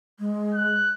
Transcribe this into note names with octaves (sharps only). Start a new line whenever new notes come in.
G#3
F#6